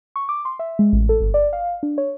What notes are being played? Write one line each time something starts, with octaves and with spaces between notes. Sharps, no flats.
C#6
D6
C6
E5
G#3
A1
A4
G1
D5
F5
D4
C#5